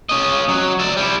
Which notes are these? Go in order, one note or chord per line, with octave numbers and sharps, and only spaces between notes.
C#4 D#5
F#3
D5 E5
G3 E4